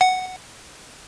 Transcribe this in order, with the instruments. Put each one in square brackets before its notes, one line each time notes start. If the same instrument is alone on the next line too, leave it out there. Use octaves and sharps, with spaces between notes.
[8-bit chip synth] F#5